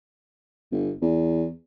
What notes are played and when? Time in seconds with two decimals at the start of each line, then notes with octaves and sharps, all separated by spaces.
0.72 G1
1.02 E2